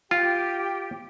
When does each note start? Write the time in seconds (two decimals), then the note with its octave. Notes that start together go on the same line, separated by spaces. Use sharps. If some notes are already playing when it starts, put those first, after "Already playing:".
0.11 F4 G4 G5